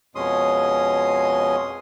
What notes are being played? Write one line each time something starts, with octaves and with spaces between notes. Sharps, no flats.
F2 B2 G#3 C#4 C6 D#6